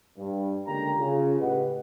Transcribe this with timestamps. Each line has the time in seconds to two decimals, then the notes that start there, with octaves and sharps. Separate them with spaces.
0.18 G2
0.66 C#2 D3 A#3 G4 G5 A#5
0.98 C#3 F4
1.39 A2 C#3 G4 B4 D#5 F#5